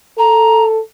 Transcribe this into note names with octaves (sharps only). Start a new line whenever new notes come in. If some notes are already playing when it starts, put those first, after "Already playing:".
A4 A#5